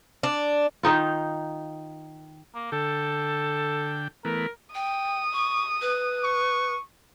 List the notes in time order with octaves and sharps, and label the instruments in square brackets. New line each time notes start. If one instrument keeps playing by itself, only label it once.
[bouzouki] D4
[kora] D#3 D#4 F4
[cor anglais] A#3
[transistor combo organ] D3 G5 [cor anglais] A4
[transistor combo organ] E3 A3 B3 [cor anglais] A#4
[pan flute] G5 [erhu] D#6
[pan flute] C#6
B4
[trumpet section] C#6